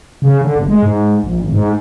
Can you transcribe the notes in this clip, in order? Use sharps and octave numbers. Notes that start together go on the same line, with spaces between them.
C#3
D3
G1
G#3
G#2
A#1
G#1
G#2